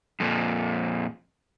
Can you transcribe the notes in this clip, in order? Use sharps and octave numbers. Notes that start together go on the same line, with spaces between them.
F2 A#2